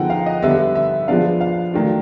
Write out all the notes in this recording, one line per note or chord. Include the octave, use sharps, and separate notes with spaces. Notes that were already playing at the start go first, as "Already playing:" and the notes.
Already playing: D3 F3 G#3 B3 D#4 F#5 G5
F5
D#5
D3 G3 B3 E5
E5
F3 G#3 B3 D4 F5
F5
D#3 F#3 A3 D4